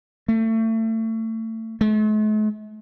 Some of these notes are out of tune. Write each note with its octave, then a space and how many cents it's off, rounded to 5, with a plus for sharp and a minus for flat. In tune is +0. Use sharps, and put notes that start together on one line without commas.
A3 +30
A3 -45